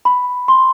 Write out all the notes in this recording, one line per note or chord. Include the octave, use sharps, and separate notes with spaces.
B5
C6